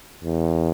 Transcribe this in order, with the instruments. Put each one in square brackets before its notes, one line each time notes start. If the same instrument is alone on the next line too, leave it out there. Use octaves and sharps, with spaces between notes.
[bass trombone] E2